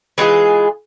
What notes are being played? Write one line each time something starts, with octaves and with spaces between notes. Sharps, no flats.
E3 G#3 F4 G#4